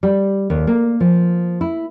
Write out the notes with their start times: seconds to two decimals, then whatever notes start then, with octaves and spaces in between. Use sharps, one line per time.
0.03 G3
0.50 D#2
0.67 A#3
1.00 F3
1.61 E4